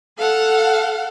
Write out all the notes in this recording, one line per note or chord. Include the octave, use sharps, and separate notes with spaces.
A4 F5 F#5